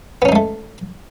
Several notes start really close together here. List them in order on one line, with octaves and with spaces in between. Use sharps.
B3 C#4 D#4 G#3 A3